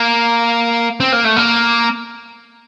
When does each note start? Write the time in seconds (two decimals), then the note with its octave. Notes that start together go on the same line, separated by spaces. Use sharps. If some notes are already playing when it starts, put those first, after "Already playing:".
Already playing: A#3
1.00 C4
1.12 A#3
1.24 A3
1.37 A#3